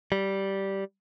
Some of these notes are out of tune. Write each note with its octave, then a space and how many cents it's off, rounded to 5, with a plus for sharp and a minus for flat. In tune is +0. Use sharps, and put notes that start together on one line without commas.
G3 -10